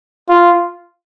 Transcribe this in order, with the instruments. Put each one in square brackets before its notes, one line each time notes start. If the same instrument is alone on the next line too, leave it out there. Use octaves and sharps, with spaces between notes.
[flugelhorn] F4